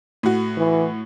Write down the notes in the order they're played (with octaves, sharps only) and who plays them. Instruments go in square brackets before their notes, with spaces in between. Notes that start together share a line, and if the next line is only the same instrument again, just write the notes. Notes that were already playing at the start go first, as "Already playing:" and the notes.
[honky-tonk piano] A2 F#4
[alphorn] E3